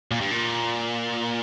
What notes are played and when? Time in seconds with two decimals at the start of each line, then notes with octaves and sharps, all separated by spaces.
0.11 A#2
0.21 G2
0.31 A#2